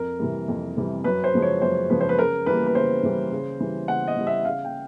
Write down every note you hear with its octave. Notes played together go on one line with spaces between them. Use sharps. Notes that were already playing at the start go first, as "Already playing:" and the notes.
Already playing: F2 A#4
C3 E3 G3
F2
C3 E3 G3
F#2 B4
C5
C#3 F3 G#3
C#5
F#2 C5
C#3 F3 G#3 B4
C5
B4
C#3 A#4
E3 G3 A#3 B4
B4
C#3 C5
E3 G3 A#3
C#3
E3 G3
C#3 F#5
D#5
E3 G3
E5
C#3 F5
G5